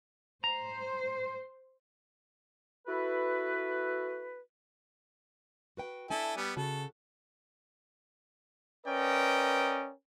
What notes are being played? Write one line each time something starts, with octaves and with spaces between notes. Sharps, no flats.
C5 A#5
E4 F#4 A4 B4
F#4 B4 G5
D4 E4 A4 G#5
G3 B3
C#3 F#4 A4
C#4 A#4 B4 D5 D#5 G5